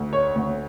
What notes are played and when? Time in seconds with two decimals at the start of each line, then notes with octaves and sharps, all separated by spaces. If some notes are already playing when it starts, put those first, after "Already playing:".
Already playing: D2
0.13 C#5
0.35 D2